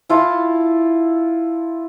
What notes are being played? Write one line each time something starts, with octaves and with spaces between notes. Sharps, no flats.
E4 F4 A4